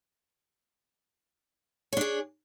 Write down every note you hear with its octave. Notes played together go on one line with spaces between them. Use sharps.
D4 G#4 C#5